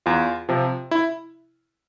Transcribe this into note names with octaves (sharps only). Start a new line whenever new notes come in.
E2 F4
C3 F3
E4